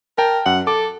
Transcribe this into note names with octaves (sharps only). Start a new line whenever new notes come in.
A#4 G5 A5
F#2 F#5
A4 D6